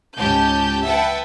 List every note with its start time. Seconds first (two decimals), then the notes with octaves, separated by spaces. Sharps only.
0.18 C#2 G#2 C#4 G4 A5 G6
0.85 B4 E5 F#5 G5 A5